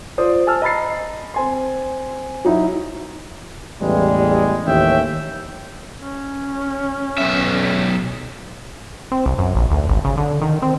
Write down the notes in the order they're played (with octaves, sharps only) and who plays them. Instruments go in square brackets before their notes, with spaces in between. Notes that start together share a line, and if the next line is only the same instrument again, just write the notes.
[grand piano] F4 C5 D5 D#6
G#5 A5 E6 F6
D#5 A#5 B5 A6 C7
C4 G#5 C6
F#3 D#4 E4
[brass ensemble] A1 E2 G3 G#3
A1 D#2 C#4 E5 G5
[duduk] C#4
[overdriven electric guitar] B1 E5
[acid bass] C4
C2
F#2
A#1
D2
G#1
C#3
D3
D#3
C4